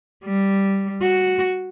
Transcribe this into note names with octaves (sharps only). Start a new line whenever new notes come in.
G3
F#4